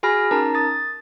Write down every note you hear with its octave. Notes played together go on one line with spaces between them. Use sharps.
F#4 G#4 G#5 B5 F6 A#6
C#4 D#4 A#4 A5 A#5
D#6 A6